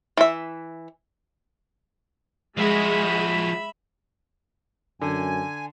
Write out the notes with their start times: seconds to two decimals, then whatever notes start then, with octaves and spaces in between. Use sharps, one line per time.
0.17 E3 E5
2.57 F3 G#3 F#4 E5 B5
5.02 F#2 D3 G#5